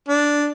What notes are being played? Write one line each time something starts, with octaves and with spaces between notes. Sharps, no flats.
D4